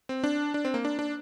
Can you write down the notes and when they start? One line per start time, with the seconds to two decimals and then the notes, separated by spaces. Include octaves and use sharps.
0.09 C4
0.24 D4
0.54 D4
0.65 C4
0.74 A#3
0.85 D4
0.99 D4